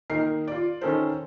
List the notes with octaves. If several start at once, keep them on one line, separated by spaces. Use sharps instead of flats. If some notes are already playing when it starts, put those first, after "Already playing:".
D#3 A#3 D#4 A#4 C7
F4 D5
D#3 C#4 A4 A#4 C5